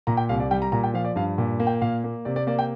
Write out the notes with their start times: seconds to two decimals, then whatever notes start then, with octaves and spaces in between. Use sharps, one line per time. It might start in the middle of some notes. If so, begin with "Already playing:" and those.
0.07 A#2 A#5
0.17 G5
0.29 C2 F5
0.40 D5
0.51 G3 G5
0.62 A#5
0.72 A#2 A#5
0.84 G5
0.94 F3 F5
1.05 D5
1.16 G2 F5
1.38 A#2
1.60 A#3
1.67 G5
1.82 A#2 F5
2.04 A#3
2.25 C3 D5
2.36 D5
2.47 A#3 D5
2.59 G5